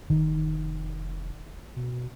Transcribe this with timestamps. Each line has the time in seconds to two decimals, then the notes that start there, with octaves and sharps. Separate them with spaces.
0.10 F1 D#3
1.76 B2